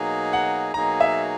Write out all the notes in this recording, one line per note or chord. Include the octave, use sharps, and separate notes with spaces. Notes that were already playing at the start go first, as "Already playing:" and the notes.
Already playing: B2 F#3 A#3 D#4 G#4
F#5
B2 F#3 A#3 D#4 G#4 A#5
E5